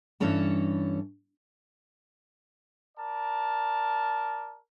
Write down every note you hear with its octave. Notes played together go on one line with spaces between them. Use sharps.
G2 E3 C#4 A4 C#5 A5
A#4 D5 A5